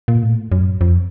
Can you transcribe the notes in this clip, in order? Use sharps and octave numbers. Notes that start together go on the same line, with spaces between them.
A#2
A2
F#2
F2